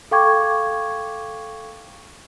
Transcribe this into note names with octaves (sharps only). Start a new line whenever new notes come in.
A4 F5 G5 C#6 D6 G#6